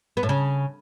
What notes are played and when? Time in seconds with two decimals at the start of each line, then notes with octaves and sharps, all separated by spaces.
0.17 B3
0.23 A2
0.29 C#3